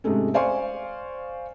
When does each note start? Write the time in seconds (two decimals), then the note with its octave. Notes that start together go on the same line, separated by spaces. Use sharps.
0.04 G#2 C3 G#3 A3 C#4
0.34 C5 D5 F5 G#5 C6 C#6